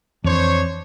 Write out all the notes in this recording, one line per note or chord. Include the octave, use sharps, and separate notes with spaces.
F2 E3 D4 C5 C#5